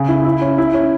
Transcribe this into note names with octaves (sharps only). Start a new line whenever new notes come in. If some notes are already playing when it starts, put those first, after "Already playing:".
Already playing: C#3
E4
E4
C#4
E4
C#4